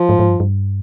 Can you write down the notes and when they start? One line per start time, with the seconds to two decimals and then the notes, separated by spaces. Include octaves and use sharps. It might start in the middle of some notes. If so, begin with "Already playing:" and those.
Already playing: F3
0.09 G#2
0.19 G#2
0.29 G2
0.40 G2